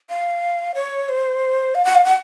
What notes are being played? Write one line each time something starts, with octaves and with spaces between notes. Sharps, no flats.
F5
C#5
C5
F5
F#5
F5
F#5